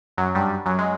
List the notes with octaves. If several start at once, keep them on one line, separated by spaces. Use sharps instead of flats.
F#2 F#3
G2 G3
F#2 F#3
G#3